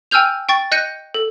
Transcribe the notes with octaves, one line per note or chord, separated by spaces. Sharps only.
G5 G#5 E6 F6 G6 F7
G5 C#6 A6
D#5 F#6 G6 A#6 C#7 D#7
A4